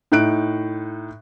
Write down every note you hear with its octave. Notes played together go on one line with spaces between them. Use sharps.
A2 D#4 F#6 D7